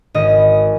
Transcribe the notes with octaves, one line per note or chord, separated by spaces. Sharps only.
G#1 D#5